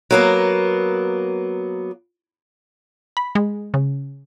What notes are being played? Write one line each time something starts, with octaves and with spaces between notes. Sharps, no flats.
F#3 A#3 B3
B5
G#3
C#3